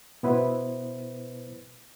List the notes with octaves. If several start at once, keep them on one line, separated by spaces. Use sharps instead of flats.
B2 B3 E4 B4 C5